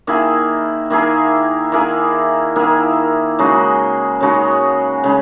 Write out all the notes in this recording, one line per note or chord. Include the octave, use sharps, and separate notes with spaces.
D#3 A#3 E4 G#4
D#3 A#3 E4 G#4
D#3 A#3 E4 G#4
D#3 A#3 E4 G#4
C#3 G#3 D#4 F#4
C#3 G#3 D#4 F#4
C#3 G#3